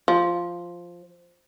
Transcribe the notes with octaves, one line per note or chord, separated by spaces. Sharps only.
F3